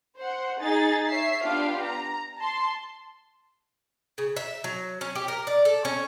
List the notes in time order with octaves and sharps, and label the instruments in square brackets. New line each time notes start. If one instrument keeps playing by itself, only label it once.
[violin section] C5 F#5
D#4 G#4 A6
C#5 E5 C7
B3 D4 F4 G4 F5
A#5
A5 C6
[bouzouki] C#3
E5
F#3
C#4
G4
A#4
D5
A4
C#4